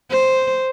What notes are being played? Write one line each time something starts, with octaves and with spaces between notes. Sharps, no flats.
C5